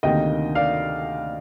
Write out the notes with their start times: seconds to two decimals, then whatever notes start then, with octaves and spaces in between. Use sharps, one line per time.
0.03 D2 C3 D#3 A#3 D#5 G5
0.55 D5 F5